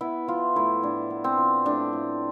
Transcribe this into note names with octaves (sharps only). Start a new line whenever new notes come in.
B3 E4
F3 F4
A2 E4
A2 D4
B3
C4
F3
A2 D4
A2